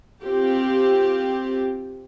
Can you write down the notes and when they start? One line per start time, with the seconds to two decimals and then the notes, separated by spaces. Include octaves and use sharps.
0.22 C4 F4 G4